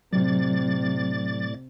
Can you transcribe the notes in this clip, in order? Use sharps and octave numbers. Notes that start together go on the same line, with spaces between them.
A2 C3 F#3 D5 A6